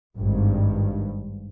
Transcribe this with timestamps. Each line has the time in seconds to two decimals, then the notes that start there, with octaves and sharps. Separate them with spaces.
0.16 G#1 G2